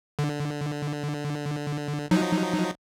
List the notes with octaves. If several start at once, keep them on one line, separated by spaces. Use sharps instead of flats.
D3
F3 F#3 D#4